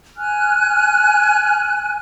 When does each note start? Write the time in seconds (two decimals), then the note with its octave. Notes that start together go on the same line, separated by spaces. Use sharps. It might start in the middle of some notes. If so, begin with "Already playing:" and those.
0.17 G#5 F6 F#6